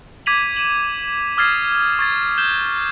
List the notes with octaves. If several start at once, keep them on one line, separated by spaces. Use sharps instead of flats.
D6 G#6 B6 D#7 F7 F#7
D#7 E7 F#7
D6 D#6 F6 G#6 A6 C7
C#6 G#6 A6
G6 E7 G7